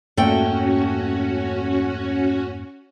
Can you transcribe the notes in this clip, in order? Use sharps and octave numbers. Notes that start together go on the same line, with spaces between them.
F2 G#2 A3 A#3 C#4 F#4 G5